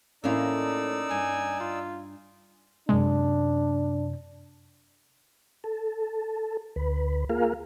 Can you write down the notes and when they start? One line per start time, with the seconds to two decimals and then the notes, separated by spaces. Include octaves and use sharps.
0.24 A2 A#3 C#4 D#4 E4 D5 F5 E6
1.11 G2 G#5
1.60 F4
2.89 F#2 C3 G#3 D4
5.64 A4
6.76 D2 B4
7.29 A#3 F4 G#4 A#4 F5